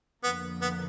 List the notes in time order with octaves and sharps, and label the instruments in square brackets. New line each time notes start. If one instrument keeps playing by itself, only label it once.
[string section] F2 D3 F3 A#3 [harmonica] B3
[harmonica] B3